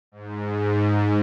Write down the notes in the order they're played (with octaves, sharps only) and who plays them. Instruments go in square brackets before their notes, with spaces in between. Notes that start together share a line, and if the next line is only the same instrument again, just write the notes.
[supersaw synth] G#2